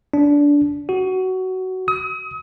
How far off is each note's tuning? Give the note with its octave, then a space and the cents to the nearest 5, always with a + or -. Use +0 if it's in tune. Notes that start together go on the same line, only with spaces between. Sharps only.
D4 -20
F#4 +15
D#6 +35